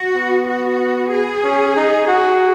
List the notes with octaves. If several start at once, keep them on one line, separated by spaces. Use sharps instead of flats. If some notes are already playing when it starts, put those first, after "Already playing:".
Already playing: F#4
B3
F#4
G#4
C#4
D#4
F#4